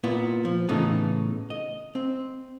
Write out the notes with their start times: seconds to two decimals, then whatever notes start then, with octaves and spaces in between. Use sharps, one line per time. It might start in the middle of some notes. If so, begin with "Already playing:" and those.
0.04 A#2 B3 E4
0.45 F3
0.69 A2 C#3 E3 B3 D#4 A4
1.50 D#5
1.95 C4